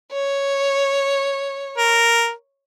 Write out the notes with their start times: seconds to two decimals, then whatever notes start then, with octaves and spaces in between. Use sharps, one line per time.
0.13 C#5
1.78 A#4